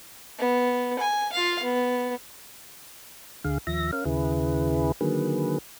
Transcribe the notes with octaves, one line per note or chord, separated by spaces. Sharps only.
B3
G#5
F4 F5
B3
D2 D3 G#4 F5
D#2 F3 E5 A#6
C#4 A#4 F5
D#2 C#3 E4 G#4 B4
D3 D#3 F#3 A#3 G#4 B4